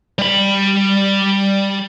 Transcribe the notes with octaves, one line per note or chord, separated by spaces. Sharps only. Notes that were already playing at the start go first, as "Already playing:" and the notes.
G3 B5